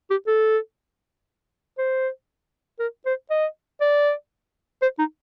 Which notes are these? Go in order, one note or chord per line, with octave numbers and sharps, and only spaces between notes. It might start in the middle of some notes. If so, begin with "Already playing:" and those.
G4
A4
C5
A#4
C5
D#5
D5
C5
D#4